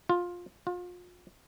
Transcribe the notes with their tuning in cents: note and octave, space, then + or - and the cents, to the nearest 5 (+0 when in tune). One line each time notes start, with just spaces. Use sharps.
F4 +15
F4 +35